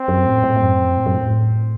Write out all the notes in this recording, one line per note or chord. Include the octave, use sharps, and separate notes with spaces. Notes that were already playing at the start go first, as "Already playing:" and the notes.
Already playing: C4
F#2
A2
A2
A2
F#2
F2
A2
F#2
A2